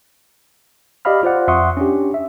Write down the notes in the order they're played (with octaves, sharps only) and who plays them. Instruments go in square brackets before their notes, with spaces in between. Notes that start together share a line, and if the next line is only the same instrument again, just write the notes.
[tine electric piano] G4 D5 D#5 F5 B5 F6
F4 C5 D5 F#5
F2 E5 F#5 C6 C#6 D#6
C#4 D4 G4
E5